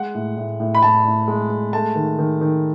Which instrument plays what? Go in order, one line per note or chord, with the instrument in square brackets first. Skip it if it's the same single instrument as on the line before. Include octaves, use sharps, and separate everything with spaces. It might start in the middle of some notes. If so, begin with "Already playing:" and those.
Already playing: [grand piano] G#3 F#5
A2
A2
A2
B5
A2 A5
A2
G#3
G#3
A3 A5
D#3
D#3
D#3